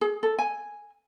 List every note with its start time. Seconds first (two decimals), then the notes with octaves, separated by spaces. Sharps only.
0.01 G#4
0.23 A4
0.39 G#5